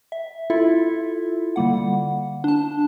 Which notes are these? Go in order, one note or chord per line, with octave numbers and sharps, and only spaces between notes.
E5
E4 F4 A4 E5
D3 G3 A#3 F#5
D4 A5